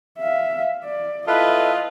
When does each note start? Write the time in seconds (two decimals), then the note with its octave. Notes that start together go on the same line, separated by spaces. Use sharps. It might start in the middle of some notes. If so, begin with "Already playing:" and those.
0.19 E5 F5
0.84 D5
1.28 E4 F4 A4 B4 D#5